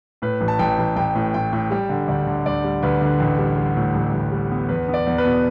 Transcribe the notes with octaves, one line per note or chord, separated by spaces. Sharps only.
A2 B4
A1
A5
A1 G5
A1
A1 G5
A2
A2 G5
A2
G3 G5
D3
D2 D5
D3
D2 D5
G3
D2 B4
D3
A1
G3
G3
A2
A1
A1
G3
B3
E2 B4
B3
D5
E2
B4
B2